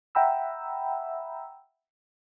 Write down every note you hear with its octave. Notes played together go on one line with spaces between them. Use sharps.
E5 F#5 G5 A#5 B5 E6